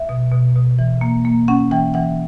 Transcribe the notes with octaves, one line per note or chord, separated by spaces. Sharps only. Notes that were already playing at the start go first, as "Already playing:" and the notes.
Already playing: E5
B2
B2
B2
E3
A#3
A#3
C#4 F#5
E3 G5
E3 F#5